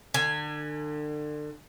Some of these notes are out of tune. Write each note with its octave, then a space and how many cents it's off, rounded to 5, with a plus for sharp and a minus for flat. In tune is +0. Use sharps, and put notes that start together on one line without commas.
D3 +35 G#5 +0